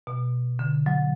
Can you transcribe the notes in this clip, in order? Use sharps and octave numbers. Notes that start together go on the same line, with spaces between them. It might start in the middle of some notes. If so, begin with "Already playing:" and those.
B2
D3
F#3